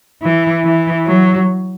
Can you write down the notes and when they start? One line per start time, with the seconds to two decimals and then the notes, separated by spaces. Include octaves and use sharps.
0.23 E3
0.65 E3
1.07 F#3